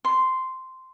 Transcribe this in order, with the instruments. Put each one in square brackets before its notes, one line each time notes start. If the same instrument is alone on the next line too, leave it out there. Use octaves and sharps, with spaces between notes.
[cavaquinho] C6